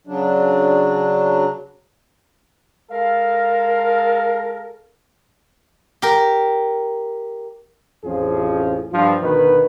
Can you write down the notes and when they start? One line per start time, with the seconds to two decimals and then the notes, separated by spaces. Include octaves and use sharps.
0.07 C#3 F#3 D4
2.92 G#3 A4 A#4 F5
6.02 G4 A#4
8.04 A1 F2 F3 C#4 G#4
8.92 G2 F3
9.22 D2 B2 D#3 B4